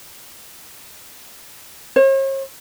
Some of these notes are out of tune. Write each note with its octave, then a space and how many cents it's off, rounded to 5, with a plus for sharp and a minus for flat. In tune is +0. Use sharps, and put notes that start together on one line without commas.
C#5 -45